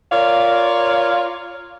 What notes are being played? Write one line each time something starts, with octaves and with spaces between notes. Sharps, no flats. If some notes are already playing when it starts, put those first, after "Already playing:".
F4 A#4 C#5 D5 F5